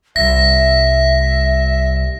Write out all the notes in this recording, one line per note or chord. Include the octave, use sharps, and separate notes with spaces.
C2 E5 A#6